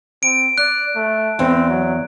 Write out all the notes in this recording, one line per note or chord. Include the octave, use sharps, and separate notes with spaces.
C4 D7
D5 F#6
A3
E2 C4
F#3